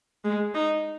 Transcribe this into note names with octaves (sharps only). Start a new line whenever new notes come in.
G#3
D#4